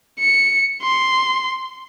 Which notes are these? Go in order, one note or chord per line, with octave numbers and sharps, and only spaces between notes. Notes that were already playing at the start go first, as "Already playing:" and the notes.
C#7
C6